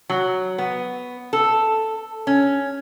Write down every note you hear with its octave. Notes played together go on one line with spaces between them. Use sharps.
F#3
B3
A4
C#4